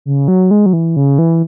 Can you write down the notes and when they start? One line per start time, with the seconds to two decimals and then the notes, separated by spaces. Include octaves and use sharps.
0.05 C#3
0.28 F#3
0.51 G#3
0.66 F#3
0.73 E3
0.96 C#3
1.18 E3